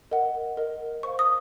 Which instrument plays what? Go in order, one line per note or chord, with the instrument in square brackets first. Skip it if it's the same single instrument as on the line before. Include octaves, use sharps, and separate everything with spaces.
[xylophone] A#4 D#5 F#5
A#4 D#5 F#5
C5 F5 C#6
D#6